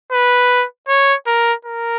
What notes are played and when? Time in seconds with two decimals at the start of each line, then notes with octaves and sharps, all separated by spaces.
0.12 B4
0.88 C#5
1.27 A#4
1.65 A#4